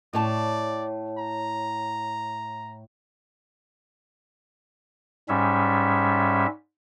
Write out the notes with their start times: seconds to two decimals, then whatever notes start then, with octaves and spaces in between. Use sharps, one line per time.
0.13 A2 C#5 D5 A5
1.18 A#5
5.29 G#2 G3 C#4 E5